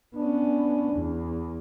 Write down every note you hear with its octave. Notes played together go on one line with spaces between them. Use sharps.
B3 C#4 D4
E2